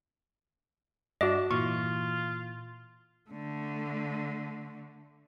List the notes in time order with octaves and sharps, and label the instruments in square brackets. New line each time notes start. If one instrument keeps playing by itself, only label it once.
[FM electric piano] G2 E5 [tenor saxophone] D4 [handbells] F#4 D#5
[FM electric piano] A#2 E3 [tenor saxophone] F4 [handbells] C#6
[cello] D3 A3